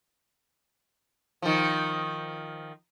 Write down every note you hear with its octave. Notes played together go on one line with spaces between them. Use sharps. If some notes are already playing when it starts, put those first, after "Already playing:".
D#3 F3